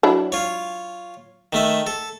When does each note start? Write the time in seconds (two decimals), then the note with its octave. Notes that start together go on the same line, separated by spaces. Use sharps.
0.03 F#3 D4 E4
0.32 F4 C#5
1.53 D#3 A3 E5
1.87 A4